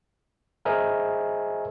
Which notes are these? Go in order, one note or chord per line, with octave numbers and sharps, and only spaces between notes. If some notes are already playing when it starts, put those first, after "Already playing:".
G#4 A#4 C5 D#5 E5 G#5